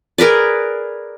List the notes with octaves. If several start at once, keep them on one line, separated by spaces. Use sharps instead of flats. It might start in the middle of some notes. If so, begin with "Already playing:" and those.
G#4 A#4 B4 D5